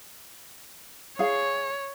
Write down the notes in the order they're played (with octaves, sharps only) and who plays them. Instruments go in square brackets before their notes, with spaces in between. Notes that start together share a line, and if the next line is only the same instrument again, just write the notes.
[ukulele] G#4 F5 [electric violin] C#5